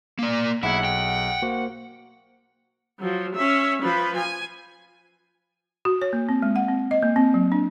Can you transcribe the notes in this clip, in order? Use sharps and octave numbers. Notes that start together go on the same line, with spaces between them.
A#3 D5
B1 E4 G#4 F#5 G#6
G5
A#3 F#4 C5
F3 F#3
C#4 E5
F3 B4
G#5
F#4
C#5
A#3
C4
G#3
F#5
C4
D#5
A#3
C4
F#3
D4